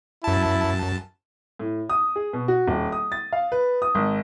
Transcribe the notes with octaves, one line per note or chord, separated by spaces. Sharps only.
F#2 E4 A5
A2
D#6
G#4
B2
F#4
D#1
D#6
A6
F5
B4
D#6
G#1